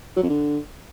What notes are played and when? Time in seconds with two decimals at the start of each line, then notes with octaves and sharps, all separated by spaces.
0.17 F#3
0.23 F2
0.29 D3